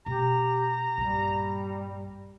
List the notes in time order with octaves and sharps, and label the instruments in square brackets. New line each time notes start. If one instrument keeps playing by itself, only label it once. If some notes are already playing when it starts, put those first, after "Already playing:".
[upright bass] B2 A3 [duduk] G4 [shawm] A#5
[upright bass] A#1 G2 [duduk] G3